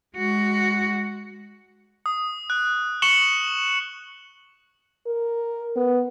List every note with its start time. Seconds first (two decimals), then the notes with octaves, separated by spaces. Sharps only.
0.16 G#3 F#4
2.06 D#6
2.50 F#6
3.02 C#6 C#7 E7 F#7 G7
5.07 A#4
5.76 B3